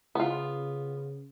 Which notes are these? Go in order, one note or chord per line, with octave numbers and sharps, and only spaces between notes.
C#3 B3 F4